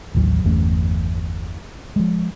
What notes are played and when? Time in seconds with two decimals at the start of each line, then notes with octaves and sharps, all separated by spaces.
0.15 A1 D#2 F#3
0.44 G1 E2 A3 C#4
1.96 F3 G#3